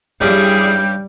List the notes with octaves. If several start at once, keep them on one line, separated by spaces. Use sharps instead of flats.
G2 G3 C#4 E4 G#4 D5 G5